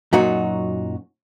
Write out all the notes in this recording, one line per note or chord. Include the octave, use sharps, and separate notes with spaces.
F#2 A#2 F#3 D#4 F#4